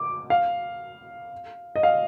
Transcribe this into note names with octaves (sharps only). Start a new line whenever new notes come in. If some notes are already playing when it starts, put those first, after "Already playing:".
Already playing: D6
F5
D#5
F5